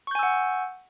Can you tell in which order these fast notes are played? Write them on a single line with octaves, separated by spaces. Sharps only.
C#6 G6 G#5 E6 F#5